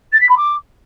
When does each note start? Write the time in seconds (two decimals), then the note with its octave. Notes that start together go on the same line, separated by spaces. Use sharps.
0.12 A6
0.20 B6
0.29 B5
0.37 D6